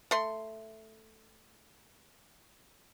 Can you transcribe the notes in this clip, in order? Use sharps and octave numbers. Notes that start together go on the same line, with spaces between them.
A3 C6